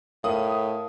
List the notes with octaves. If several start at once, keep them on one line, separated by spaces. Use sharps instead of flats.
A2 A#4 F5 D#6